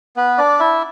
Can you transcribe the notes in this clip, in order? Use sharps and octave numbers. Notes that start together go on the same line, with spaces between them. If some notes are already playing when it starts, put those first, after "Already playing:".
B3 B4
D4 D5
E4 E5